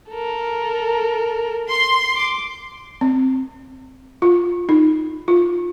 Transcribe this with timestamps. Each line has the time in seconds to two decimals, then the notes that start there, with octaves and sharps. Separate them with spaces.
0.10 A4 A#4
1.69 C6
2.16 D6
3.01 C4
4.22 F4
4.69 D#4
5.28 F4